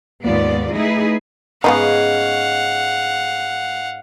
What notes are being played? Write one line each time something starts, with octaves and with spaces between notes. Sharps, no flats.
D#2 G#2 B3 F4 D5
A3 D#4 E4 G#4 B4
G#2 C#3 G#3 B3 C#4 D#4 F5 F#5